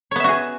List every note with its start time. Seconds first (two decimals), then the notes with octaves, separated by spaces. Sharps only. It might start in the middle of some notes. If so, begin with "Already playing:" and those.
0.11 C#5
0.16 B3
0.20 E5
0.24 F#4
0.29 G#4